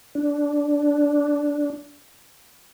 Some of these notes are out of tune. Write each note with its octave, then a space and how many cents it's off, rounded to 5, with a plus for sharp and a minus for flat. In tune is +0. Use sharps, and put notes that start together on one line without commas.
D4 -10